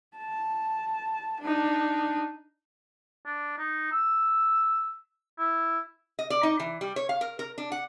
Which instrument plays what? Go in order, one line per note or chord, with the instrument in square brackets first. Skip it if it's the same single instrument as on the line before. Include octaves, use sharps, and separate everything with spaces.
[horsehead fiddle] A5
D4 D#4
[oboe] D4
D#4
E6
E4
[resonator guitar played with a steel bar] D#5
D5
D#4
E3
G3
C#5
F5
A#4
A#4
D4
F#5